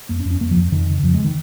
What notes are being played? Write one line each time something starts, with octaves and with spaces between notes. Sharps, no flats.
F2 A#3
C#4
F2
C#4
F2 A#3
F3
F2
F2 D#3
C#3
F2 F3
G#3
D#3